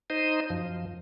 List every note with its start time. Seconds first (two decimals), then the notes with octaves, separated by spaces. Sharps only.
0.10 D#4 C5 D#5
0.50 F#2 F3